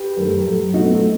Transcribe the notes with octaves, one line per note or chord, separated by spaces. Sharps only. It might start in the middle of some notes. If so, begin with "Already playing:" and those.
Already playing: G4 B4
F#2 D#3 A3
A2 F#3 A3
B2 F#3 A3 D#4 F#4
B3
A3 C4